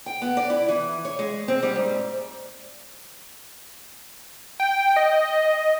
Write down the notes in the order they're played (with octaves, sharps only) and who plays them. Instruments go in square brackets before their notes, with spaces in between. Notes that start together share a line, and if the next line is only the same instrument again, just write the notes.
[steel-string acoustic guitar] G5
B3
D5
E4
E3
C#5
G#3
C4
G3
G#2
[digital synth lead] G5
D#5